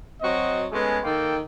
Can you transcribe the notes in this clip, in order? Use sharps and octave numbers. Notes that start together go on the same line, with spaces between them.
F#3 C4 F#4 D#5
G#3 A3 B3 C#4 G#4
D#3 A#3 D#4 A4 G5